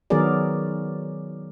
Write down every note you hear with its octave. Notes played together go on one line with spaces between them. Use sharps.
D#3 F#3 B3 G#4 A#4 D5